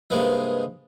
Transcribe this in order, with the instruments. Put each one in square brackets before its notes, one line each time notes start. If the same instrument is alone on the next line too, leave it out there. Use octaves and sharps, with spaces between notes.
[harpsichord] G2 C3 G#3 A#3 B3 D#4